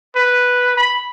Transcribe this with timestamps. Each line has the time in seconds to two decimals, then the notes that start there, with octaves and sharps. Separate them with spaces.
0.16 B4
0.77 B5